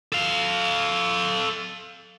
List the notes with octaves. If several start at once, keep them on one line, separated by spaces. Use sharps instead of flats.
A4 F5